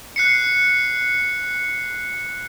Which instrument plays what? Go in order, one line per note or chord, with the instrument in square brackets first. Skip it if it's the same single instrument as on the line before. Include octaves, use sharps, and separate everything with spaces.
[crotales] F#6 C7 C#7